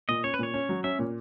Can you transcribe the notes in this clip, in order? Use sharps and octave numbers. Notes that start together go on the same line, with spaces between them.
A#2 D#5
C#4 C#5
B4
A#2 C#5
C#4
F#3
C#4 E5
A#2